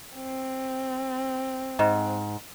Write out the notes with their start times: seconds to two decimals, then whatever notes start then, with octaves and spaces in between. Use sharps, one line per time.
0.15 C4
1.79 G#2